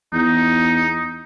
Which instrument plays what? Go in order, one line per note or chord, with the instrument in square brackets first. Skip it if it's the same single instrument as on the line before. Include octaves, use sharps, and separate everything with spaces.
[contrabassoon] E2 [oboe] D#4